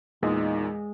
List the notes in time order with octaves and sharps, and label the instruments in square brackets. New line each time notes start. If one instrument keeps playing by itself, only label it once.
[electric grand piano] E2 A#2 [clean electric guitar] G#3 [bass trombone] D#4